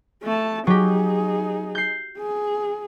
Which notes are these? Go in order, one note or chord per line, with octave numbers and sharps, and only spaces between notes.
A3 A5
F#3 D#4 G4 G#4
G6 C7
G#4